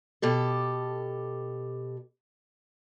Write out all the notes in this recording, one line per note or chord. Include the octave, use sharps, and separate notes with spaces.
B2 G4 A4